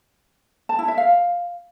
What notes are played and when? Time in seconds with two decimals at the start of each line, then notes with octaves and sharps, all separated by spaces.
0.69 A5
0.79 E4
0.88 E5
0.98 F5